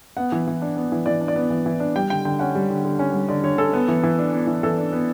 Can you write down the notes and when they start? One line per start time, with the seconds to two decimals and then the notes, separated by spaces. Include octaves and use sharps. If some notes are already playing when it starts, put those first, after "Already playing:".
0.17 B3 F#5
0.32 E3
0.47 E3
0.62 D4
0.77 B3
0.92 E3
1.06 E3 D5
1.21 D4
1.28 D5
1.36 B3
1.50 E3
1.66 E3
1.80 D4
1.96 G3 G5
2.10 D3 G5
2.25 D3 G5
2.39 C#4 F#5
2.55 G3
2.70 D3
2.84 D3
2.99 C#4
3.14 G3
3.29 D3 D5
3.44 D3 C#5
3.58 C#4 A4
3.73 B3
3.88 E3
4.03 E3
4.19 D4
4.33 B3
4.47 E3
4.63 E3 A4
4.78 D4
4.93 B3